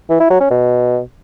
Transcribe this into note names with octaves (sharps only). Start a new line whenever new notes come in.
E3
E4
F#3
C#4
B2